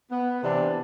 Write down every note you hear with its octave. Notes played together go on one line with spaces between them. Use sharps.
B3
C3 E3 D4